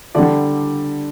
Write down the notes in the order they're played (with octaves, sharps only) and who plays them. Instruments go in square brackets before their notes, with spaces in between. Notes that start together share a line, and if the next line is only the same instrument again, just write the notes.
[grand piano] D3 G3 D5 F#5